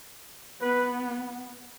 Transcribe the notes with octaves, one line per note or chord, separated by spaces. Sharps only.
B3 B4